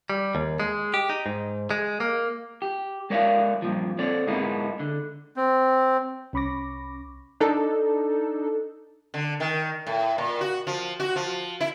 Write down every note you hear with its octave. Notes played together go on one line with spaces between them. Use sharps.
G3
D#2
G#3
G4
D#4
G#2
G#3
A#3
G4
G#3 A#4 C#5 D5 E5 F5
G2 A#2 F3
C4 A4 C#5 D5
G#2 G#3 A#3 B3 D#4 E4
D3
C4
C2 C#4 B5 C#6 D6 A#6
D4 D#4 A4
D3
D#3
A2
A#2
F#4
F3
F#4
F3
E4